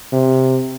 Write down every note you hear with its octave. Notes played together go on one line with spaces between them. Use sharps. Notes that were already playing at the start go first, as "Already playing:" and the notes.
C3